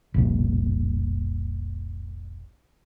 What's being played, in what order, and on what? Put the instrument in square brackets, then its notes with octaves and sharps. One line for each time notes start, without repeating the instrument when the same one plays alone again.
[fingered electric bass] F1 C2 A#2